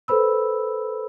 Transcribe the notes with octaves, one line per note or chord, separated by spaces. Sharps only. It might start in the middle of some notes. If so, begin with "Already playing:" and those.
A4 B4 C5 B5 E6